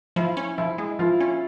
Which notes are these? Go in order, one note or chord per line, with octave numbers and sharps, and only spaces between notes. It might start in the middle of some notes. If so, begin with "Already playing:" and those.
F3 E4
C#4
F3 E4
G#3
F3 F4
C#4